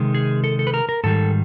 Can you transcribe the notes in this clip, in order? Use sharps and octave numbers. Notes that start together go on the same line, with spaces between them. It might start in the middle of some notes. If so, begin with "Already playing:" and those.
Already playing: C3 D#3 G#3
G#4
A4
A4
B4
A#4
A#4
G#2 D#3 G3 A4